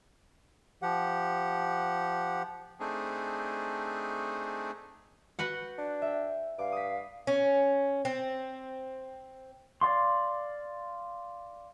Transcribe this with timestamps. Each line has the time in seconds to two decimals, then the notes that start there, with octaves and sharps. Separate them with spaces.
0.82 F3 G4 F#5
2.80 A3 C4 D4 D#4 G#4
5.39 F#4 B4 F#5 G6
5.78 D4
6.02 E5 G5
6.59 G2 F5 D6
6.72 D#6 B6
7.27 C#4
8.05 C4
9.81 D5 F5 C6